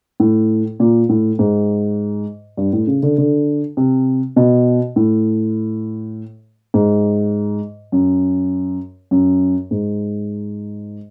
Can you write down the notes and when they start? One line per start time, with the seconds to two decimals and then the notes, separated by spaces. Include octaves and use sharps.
0.20 A2
0.80 A#2
1.09 A2
1.39 G#2
2.57 G2
2.73 A2
2.87 C#3
3.03 D3
3.18 D3
3.77 C3
4.36 B2
4.96 A2
6.74 G#2
7.92 F#2
9.11 F#2
9.71 G#2